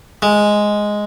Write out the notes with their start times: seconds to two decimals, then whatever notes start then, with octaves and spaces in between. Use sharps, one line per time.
0.22 G#3